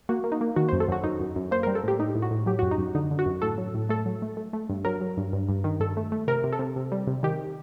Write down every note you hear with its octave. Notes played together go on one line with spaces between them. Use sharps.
A#3 F#4
A#3
D#4
A#3
D#3 F#4
C5
F#2
A4
F#2 F#4
F#2 D#4
F#2
F#2
A#3 C5
A#4
G3
A4
A2 G4
A2 D#4
A2
F#4
A2
F#3 G4
F#4
F#2
D#4
F#2
D3 D#4
D3
F#4
F#2
A2 A4
F#3
A2
A3 A4
F#3
A3
A3
A3
G2
F#3 A#4
F#3
G2
G2
G2
D#3
G2 A4
A3
A3
C3 A#4
C3
A4
C3
C3
G3
C3
D#3 G4